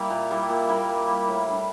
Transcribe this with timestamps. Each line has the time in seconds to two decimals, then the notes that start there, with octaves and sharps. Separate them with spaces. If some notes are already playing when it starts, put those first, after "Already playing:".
Already playing: G3 A#3 E4
0.10 A#2
0.31 G3 A#3 E4
0.50 A#2
0.69 G3 A#3 E4
0.89 A#2
1.07 G3 A#3 E4
1.28 A2
1.47 G3 D4